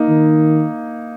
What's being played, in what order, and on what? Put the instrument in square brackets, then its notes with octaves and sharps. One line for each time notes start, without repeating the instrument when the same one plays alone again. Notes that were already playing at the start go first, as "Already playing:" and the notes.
Already playing: [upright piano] A#3 D#4
[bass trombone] D#3